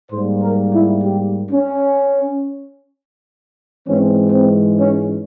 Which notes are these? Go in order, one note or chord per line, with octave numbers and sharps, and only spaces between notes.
G#2 G3 A#3 C5
A#4
E4
G4
C#4
G#2 E3 G#3 C4 C#4
C4
C#4